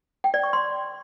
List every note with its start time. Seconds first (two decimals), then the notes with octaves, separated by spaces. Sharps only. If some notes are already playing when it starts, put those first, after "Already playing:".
0.24 G5
0.34 D5
0.43 C#6
0.53 C6